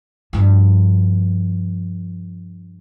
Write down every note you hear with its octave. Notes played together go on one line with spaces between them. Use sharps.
G2 F3